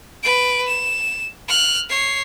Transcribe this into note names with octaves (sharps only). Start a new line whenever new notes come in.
B4 D7
E7
F6 F#6
C#5 C7